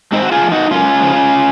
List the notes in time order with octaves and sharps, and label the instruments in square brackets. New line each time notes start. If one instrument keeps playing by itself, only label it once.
[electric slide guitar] G#2 C4 D#4
F#4
F4 G#4
F3
D#4 F#4
F#2 C#4 F4
C#3 F3